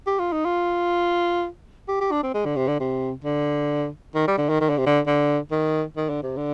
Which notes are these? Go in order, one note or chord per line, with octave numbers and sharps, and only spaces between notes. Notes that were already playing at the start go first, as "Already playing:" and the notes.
G4
F4
D#4
F4
G4
G4
D4
C4
G#3
D3
C3
D3
C3
D3
D#3
G3
D3
D#3
D#3
D3
C3
D3
D3
D#3
D#3
D3
C3
D3